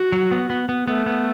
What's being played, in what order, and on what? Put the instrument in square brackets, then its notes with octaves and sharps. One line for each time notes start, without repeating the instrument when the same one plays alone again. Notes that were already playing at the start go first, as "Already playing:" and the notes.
Already playing: [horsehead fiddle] F#4
[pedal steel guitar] F#3
B3
B3
B3
[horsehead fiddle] A3 [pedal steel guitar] B3
[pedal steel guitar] B3